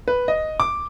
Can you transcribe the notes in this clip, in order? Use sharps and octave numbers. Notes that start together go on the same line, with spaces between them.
B4
D#5
D6